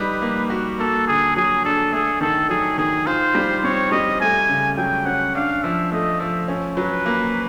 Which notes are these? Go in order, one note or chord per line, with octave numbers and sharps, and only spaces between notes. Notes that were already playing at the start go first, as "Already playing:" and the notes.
Already playing: G3 D#4 B4
A#3
F#4
A#3 A4
D3 G#4
F#3 G#4
D4 A4
A3 G#4
D#3 A4
F#3 G#4
D#3 G#4
F4 C5
G3
C4 C#5
G3 D#5
A3 G#5
C#3
F#3 G5
C#4 F#5
D4 F5
F3 E5
A3 D#5
F3 E5
C#4
F#3 B4
A#3